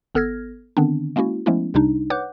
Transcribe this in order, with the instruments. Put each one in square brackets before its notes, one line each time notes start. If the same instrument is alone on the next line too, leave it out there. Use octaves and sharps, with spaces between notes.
[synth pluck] G#1 B3 A4 F6 G#6 A#6
D3 D#3 B3 C4 D4
G#3 A#3 C#4 E4 F#4
F3 G#3 A3 B3 C#4 E4
C2 C3 G3 D4 D#4
B4 C#5 F#5 D6 F#6 G6